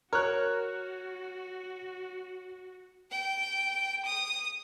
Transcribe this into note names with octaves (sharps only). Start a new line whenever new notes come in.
F#4 A#4 C#5 F6 F#6
G5
D#6